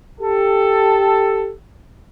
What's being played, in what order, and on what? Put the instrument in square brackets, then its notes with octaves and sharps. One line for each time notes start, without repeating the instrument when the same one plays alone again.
[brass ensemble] G4 A4